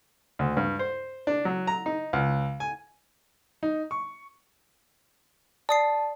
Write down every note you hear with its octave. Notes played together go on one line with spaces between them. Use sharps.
D2
G2
C5
D4
F#3
A#5
D#4
C#2
G#5
D#4
C#6
D5 A5 D#6 C7